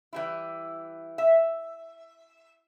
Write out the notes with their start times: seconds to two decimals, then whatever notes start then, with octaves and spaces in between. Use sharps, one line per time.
0.13 E3 G3 E4
1.18 E5